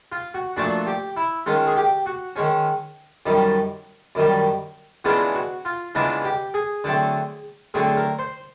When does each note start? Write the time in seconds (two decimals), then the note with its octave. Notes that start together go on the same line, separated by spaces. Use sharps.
0.12 F4
0.34 F#4
0.57 A#2 F3 A3 D4 F#4
0.87 G4
1.17 E4
1.46 D#3 G#3 C#4 F4
1.67 G#4
1.77 G4
2.06 F#4
2.36 D#3 G#3 C#4
3.26 F#2 D#3 G3
4.15 F#2 D#3 G3
5.05 C#3 E3 G#3 B3 D4 F4
5.35 F#4
5.65 F4
5.95 C#3 E3 G#3 B3 D4 F4
6.25 G4
6.54 G#4
6.84 D3 F#3 A3 C4
7.74 D3 F#3 A3 C4 G#4
7.97 A#4
8.19 C5